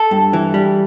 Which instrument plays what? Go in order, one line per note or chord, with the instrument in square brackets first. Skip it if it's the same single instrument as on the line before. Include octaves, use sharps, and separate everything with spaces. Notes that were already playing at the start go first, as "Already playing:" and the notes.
Already playing: [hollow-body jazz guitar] A4
G2
E3
G3